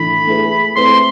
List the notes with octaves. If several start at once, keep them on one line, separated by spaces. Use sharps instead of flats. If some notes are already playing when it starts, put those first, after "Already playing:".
Already playing: A2 E3 D4 A4 B5
A3 E4 G#4 B4
A3 C4 E4 B4 C6